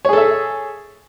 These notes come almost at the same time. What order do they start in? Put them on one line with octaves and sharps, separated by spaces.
C#5 G#4 A4 E5